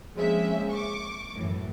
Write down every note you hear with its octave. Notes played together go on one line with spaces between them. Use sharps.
F3 G#3 A#3 C4 C#4 E5
C#6 D6
F#2 A2 E3